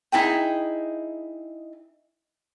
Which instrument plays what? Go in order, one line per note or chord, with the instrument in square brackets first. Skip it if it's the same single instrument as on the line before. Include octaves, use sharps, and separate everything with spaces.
[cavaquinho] D#4 E4 G#4 G5